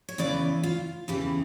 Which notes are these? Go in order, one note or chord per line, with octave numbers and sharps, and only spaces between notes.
C#5
E2 C#3 E3 D5
F4
E2 C#3 E3 G4